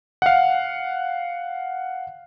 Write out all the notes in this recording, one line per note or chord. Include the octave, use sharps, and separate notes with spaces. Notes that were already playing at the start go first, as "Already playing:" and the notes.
F5 F#5